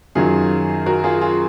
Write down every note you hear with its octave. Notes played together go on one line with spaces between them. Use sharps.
F#2 D#3 F#3 F4 G#4
F#4 A#4
F4 G#4
F4 G#4